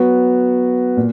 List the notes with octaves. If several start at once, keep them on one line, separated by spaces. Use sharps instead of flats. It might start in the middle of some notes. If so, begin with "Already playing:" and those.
Already playing: F#3 B3 F#4
A#2